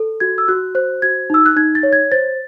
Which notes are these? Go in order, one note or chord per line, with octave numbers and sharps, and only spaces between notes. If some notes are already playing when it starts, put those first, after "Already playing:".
Already playing: A4
F#4 G#6
E6
F#4 F#6
C5 F#6
F#4 G#6
D#4 E6
F#6
D#4 G#6
A6
C#5
G#6
C5 A6